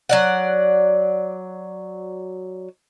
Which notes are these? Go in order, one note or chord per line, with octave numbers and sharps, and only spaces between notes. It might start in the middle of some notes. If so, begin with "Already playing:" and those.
F#3 D5 F#5